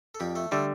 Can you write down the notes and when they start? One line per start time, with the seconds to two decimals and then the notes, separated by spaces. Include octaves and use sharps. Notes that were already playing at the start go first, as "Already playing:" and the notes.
0.15 A4
0.20 F2 G3 G4
0.35 A3 A4
0.51 D3 G3 A3 A4